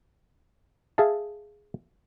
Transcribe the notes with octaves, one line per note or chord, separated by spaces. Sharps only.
G#4 E5 F5 A5